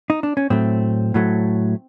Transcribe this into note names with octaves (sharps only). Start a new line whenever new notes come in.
D#4
D4
C#4
A2 F#3 A3 C4
A2 F#3 A3